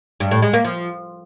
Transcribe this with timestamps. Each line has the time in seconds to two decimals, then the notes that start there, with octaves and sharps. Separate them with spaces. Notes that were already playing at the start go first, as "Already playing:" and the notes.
0.20 G2
0.31 A2
0.42 G#3
0.53 A#3
0.65 F3